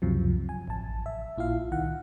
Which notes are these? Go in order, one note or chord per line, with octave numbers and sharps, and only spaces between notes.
C#2 F#2 C3 F3 F#3
G#5
A1 A5
E5
A#1 A#2 E4 F4 F5
C2 D#3 F#5